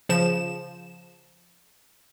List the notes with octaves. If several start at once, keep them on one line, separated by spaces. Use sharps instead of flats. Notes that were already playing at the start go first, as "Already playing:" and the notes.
C#3 F3 E7